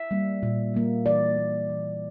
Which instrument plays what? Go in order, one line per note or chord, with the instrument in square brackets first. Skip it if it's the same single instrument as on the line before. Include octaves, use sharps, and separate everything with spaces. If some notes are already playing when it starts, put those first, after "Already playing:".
Already playing: [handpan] E5
G3 A#3
A#2
G3 A#3
E3 D5
A#3
E3